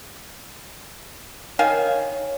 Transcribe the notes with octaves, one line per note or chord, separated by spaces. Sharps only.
D#3 C#5 F5 G#5